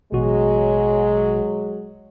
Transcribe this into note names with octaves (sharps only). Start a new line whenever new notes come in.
A1 B2 F#3 G#3 F#4